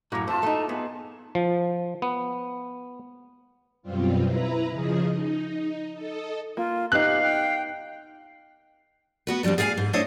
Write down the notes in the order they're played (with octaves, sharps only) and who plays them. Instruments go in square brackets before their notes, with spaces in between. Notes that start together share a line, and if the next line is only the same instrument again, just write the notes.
[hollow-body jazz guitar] F#2 A2 [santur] A#3 F#4 C#6 [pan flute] A#5
[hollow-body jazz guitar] F2 C5 [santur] F4 E5 [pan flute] A5
[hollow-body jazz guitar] A3 D#4
[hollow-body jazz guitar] B3 [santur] G#4
[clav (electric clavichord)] F3
B3
[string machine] F#2 B2 G3 C4 F4
E4 B4 A#5
C#3 F3 G#4 D#5
D#4
A4 D#5
[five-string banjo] A#3 [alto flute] F4
[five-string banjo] B3 D#4 [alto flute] G4 [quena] F5 [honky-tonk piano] F#6
[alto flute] G5
[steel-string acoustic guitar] B3 F#4 B4
F2 F3 G3 G#3 D4
G#4 D5 F5 G5 G#5
G#2
A3 D4 E4 C5 C#5 D#5